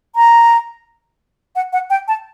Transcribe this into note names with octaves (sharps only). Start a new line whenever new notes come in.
A#5
F#5
F#5
G5
A5